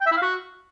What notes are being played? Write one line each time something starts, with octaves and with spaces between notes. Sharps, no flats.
G5
E5
E4
F5
F#4